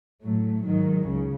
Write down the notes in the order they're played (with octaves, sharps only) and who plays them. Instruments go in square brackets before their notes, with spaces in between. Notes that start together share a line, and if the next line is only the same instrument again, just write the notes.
[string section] A2 F#3 A3
G#2 D#3 F#3
C#2 C#3